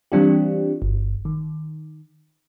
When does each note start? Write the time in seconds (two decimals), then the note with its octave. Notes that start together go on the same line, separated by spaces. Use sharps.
0.12 E3 G3 C4 D4 F4 G4
0.82 G1
1.25 D#3